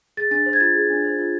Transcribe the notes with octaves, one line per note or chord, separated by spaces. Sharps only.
G#4 A6
D4 A6
C5
G#6
F4 A6
G#4
D4
C5
F4